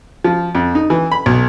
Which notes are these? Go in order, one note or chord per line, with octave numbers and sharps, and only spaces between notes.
F3
F2
D#4
E3
B5
B1